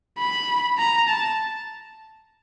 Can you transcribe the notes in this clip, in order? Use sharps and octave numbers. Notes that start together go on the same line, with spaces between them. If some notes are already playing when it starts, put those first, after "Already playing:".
B5
A#5
A5